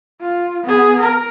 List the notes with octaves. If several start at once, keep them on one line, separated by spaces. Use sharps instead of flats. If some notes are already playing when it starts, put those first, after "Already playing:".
F4
B3 G#4
A#4